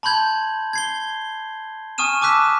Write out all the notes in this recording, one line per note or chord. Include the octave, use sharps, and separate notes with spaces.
A5 B5 C6 G6 G#6 F#7
G#6 C7 G7
G#5 C#6 D#6 F6 D#7 E7
A5 D6 E6 F#6 B6